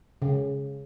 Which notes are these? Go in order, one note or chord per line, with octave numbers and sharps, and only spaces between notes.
C#3